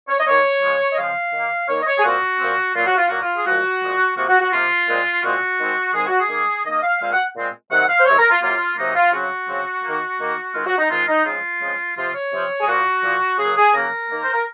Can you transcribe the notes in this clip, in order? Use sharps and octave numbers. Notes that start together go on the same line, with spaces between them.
C#5
D#5
D#3 A#3 C#5
C#3 F3 G#3
D#5
C#3 F3 G#3 F5
D#3 A#3
D#3 A#3 C#5
D#5
C#5
G#4
A#2 F3 C4 F#4
A#2 F3 C4
A#2 F#3 A#3 F4
F#4
F4
A#2 F#3 A#3 F#4
F4
G#4
A#2 F3 G#3 F#4
A#2 F3 G#3
C3 F3 A#3 F#4
F#4
F#4
C3 F3 A#3 F4
A#2 G#3 C4
A#2 G#3 C4 F#4
D#3 G#3 C4
D#3 G#3 C4 G#4
F#4
G#4
D#3 A#3
D#3 A#3 D#5
F5
A#2 G#3 C4 F5
F#5
A#2 G#3 C4
C3 D#3 F#3 C4 F#5
F5
C5
C3 D#3 F#3 C4 C#5
A#4
F4
C3 F#3 A#3 F4
C3 F#3 A#3 D#4
F4
C#3 F#3 C4 F#4
C#3 F#3 C4
D#3 A#3
D#3 A#3
D#3 G#3 C4 F4
F#4
D#4
D#3 G#3 C4 F4
D#4
C#3 F3 G#3 C4 F4
C#3 F3 G#3 C4
C3 F3 C4 F4
C#5
C3 F3 C4
G#4
A#2 F3 A#3 F#4
A#2 F3 A#3
C#3 F#3 A#3 G#4
G#4
C#3 F#3 A#3 A#4
D#3 A#3
C5
A#4